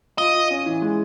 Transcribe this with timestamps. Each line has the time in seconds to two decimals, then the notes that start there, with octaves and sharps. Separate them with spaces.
0.18 F4 D#5
0.34 F4
0.50 C#4
0.66 E3
0.82 G#3